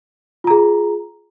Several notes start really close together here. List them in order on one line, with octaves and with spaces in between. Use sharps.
F4 A#5 G#4